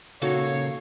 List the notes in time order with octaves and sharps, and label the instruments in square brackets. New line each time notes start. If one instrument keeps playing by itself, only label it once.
[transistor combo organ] A#2 C#3 [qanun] D#4 F#4 A4 [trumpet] C#5 [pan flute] F5